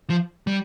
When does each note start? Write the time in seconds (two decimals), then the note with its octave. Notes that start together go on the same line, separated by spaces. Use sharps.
0.10 F3
0.47 G3